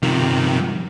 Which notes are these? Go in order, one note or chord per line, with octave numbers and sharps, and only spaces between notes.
G2 C3 D#3 F3